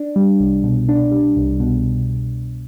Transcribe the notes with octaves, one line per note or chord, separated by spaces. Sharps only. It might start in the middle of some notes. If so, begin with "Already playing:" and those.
Already playing: D4
G3
C2
B2
D4
G3
C2
B2